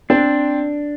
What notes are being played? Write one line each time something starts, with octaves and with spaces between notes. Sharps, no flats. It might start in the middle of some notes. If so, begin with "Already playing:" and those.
C4 D4